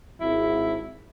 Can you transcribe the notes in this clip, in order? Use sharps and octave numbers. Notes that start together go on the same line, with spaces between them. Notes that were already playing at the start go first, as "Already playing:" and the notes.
G#1 E4